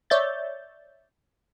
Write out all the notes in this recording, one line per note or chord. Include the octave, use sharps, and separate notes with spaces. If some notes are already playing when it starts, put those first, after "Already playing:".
C#5 D5 E5 G6 A6